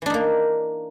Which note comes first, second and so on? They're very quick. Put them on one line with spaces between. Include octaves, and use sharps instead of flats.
E3 D4 D#4 A#3